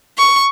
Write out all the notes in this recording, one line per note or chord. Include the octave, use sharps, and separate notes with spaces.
C#6